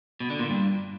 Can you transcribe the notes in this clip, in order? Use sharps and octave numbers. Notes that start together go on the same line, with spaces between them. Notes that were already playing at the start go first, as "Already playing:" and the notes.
B2
D3
A#2
G2